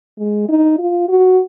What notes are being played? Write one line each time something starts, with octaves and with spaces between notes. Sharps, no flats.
G#3
D#4
F4
F#4